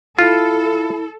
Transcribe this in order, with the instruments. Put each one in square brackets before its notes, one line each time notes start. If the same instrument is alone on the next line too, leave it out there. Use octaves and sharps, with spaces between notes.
[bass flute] E4 [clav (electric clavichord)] F4 [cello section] A4